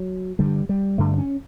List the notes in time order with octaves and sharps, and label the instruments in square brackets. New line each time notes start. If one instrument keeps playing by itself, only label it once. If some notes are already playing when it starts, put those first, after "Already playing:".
Already playing: [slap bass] F#3
G2 D3 G3
G3
G2 D3 A3
C#4